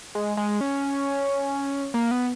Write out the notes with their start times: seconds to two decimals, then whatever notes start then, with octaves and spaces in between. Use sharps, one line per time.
0.15 G#3
0.37 G#3
0.61 C#4
1.94 A#3
2.11 B3